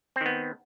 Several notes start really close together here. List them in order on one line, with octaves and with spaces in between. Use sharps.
C4 D#3 B3